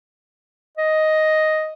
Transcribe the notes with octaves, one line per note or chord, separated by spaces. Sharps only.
D#5